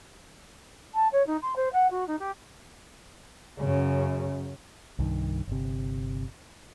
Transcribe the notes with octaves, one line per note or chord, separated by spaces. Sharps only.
A5
C#5
D#4
C6
C5
F#5
F#4
D#4
G4
F#2 C#3
C2 G2 D#3
G1 C3